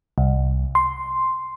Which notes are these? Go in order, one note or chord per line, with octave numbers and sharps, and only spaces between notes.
C2
C6